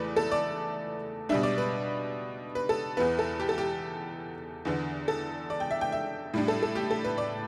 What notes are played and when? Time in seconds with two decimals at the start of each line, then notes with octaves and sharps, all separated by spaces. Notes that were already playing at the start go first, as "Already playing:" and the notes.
Already playing: E2 E3 A3 B4 D5
0.17 A4
0.32 D5
1.29 B2 G3 D4 E5
1.43 D5
1.58 B4
2.55 B4
2.69 A4
2.97 E2 E3 B3 B4
3.19 A4
3.40 G4
3.49 A4
3.58 G4
4.65 E2 D3 B3 D4
5.08 A4
5.50 D5
5.60 G5
5.71 E5
5.81 G5
5.92 E5
6.34 A2 G3 D4
6.48 A4
6.63 A4
6.75 G4
6.91 A4
7.04 B4
7.18 D5